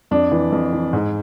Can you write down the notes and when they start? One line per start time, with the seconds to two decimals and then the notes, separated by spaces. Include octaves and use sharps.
0.11 F2 D4
0.32 E3
0.52 F2
0.73 E3
0.93 G#2